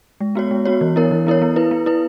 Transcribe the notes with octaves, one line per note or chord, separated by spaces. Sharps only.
G#3
B3 F#4 C#5
G#3
B3 F#4 C#5
E3
B3 E4 A#4 C#5
E3
B3 E4 A#4 C#5
B3
E4 B4
B3
E4 B4